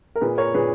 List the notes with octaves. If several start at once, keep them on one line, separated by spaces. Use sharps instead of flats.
A#4
A#2 G#4 B4
A#4 C#5
A#2 G#4 B4